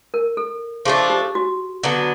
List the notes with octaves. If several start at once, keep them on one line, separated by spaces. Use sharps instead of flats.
A#4
A4
F3 A3 D4 G#4
G4
F#4
D3 F#3 B3